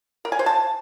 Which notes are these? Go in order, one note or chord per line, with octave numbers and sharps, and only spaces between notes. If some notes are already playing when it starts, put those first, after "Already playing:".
A#4
G#5
C5
A5